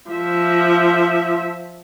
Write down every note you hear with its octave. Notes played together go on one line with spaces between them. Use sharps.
F3 E5